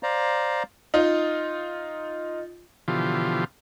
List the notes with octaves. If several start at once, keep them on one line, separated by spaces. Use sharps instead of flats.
C5 D5 F5 A#5
D#4 F4
B2 D3 E3 F3 F4 G4